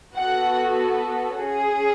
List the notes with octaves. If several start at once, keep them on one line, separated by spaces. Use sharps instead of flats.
B3 F#4 A4 F#5
C#4 G#4